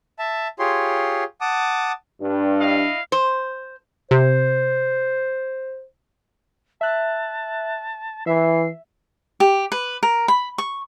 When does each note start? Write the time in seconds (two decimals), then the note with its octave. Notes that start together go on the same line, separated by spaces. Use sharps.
0.19 E5 A5
0.59 F4 G4 G#4 C#5 C6
1.41 F#5 A5 D6 D#6
2.21 G2 D4
2.60 E4 D#5 F5
3.12 C5
4.11 C3 C5
6.81 E5 A5 F#6
8.27 E3 E5 C7
9.40 G4
9.72 B4
10.03 A#4
10.28 B5
10.58 C#6